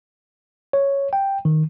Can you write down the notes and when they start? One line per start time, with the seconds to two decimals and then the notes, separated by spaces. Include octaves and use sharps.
0.73 C#5
1.13 G5
1.45 D#3